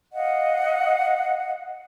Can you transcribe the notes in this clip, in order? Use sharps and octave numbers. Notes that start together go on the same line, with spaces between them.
D#5 F5 F#5